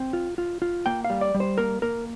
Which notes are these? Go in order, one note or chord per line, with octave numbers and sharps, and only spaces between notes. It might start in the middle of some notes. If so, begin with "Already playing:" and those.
Already playing: C4
F4
F4
F4
A#3 G5
F5
G3
D5
G3
C5
A#3 A#4
A#3 A#4